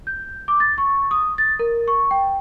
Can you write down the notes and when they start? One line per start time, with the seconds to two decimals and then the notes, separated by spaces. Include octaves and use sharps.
0.07 G6
0.48 D6
0.60 A6
0.78 C#6
1.11 D#6
1.38 A6
1.59 A#4
1.88 C#6
2.11 G5